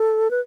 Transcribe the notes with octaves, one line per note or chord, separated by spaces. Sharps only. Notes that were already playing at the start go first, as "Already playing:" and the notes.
Already playing: A4
B4